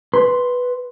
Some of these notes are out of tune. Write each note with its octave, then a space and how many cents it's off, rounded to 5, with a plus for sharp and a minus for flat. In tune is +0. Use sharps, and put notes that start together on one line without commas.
B4 +0 C6 +0